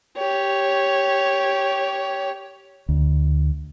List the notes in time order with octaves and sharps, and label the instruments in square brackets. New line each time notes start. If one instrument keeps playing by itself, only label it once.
[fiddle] G4 C#5
[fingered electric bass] D2